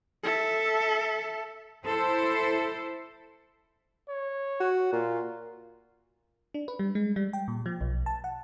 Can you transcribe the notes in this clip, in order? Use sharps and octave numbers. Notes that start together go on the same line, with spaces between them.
A4 E5
E4 A4 C5
C#5
F#4
A#2 F4
D4
B4
G3
G#3
G3
G5
A#2
F3
B1
A5
F#5